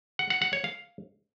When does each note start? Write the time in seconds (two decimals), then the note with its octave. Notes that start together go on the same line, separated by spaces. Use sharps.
0.19 F#5
0.30 F#5
0.42 F#5
0.53 C#5
0.64 F5